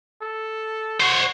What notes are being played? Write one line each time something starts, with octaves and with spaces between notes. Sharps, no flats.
A4
F#4 C5 C#5